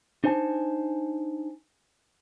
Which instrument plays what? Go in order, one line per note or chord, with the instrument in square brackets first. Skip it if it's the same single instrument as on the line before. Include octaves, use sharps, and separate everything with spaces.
[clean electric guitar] D4 D#4 C5 G#5 A5